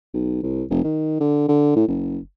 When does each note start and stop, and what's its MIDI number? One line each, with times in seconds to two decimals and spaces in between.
0.14 0.39 35
0.43 0.63 36
0.70 0.82 29
0.84 1.16 51
1.20 1.45 50
1.48 1.71 50
1.76 1.86 45
1.87 2.18 30